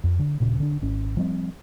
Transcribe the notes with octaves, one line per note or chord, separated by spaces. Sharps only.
F2
D3
D#1 A#2 C#3
D3 D4
G#1 C#4
F3 G3 C4